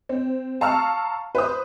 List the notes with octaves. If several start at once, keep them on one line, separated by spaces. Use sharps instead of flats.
C4
F5 A5 A#5 C#6 E6 F6
B4 C5 D#6